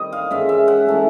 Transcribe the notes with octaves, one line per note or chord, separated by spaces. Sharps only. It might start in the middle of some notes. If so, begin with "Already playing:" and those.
Already playing: D#3 G3 C4 D#5
F5
G#2 D#3 G#3 C#4 E5
E5
F#5
E3 A3 C#4